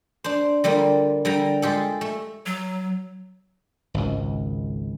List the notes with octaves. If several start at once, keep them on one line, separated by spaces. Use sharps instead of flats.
D4 C5
D3 G3 A#3 F4
D3 G3 G5 A#5
G#3 F4 G4 A4
A3
F#3
G#1 C#2